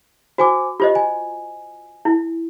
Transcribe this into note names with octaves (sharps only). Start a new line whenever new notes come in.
F#4 C5 G#5 D6
F4 G4 C5 D#5
G#5
E4